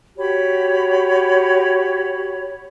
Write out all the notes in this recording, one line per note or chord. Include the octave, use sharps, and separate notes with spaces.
F#4 G4 C#5 B5